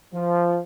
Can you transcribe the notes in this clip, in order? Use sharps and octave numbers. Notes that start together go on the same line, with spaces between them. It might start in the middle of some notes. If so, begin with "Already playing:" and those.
F3